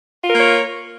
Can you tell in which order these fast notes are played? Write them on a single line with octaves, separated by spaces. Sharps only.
F4 A#4 A#3 C#5